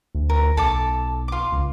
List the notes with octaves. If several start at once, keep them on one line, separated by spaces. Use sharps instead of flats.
D2
A#4
B1 A4 A5 D6
F4 D6
C#2